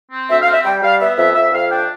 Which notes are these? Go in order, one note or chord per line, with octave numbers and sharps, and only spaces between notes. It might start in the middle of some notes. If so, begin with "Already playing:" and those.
C4
D2 E5
F5
C4
E5
G3 G5
G3 F5
B3 E5
F2 E5
F2 E5
F2 F5
D4 G5